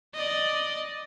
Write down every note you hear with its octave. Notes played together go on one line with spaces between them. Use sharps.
D5 D#5